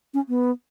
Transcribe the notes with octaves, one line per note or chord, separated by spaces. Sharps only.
C#4
B3